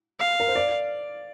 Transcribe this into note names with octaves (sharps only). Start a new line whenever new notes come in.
F5
A#4
C5
D5